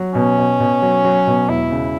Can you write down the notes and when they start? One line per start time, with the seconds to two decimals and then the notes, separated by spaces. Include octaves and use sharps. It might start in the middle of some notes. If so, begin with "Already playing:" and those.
Already playing: F#3
0.15 B2 C#4
0.38 B2
0.60 B2
0.82 F#3
1.04 F#3
1.27 B2
1.48 E1 E4
1.71 C#3